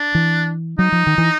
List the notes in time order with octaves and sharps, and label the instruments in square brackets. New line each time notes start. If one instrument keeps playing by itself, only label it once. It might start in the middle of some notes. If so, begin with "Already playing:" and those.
Already playing: [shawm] D4
[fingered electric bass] E3
[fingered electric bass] F#3 [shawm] D#4
[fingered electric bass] F3
D#3
E3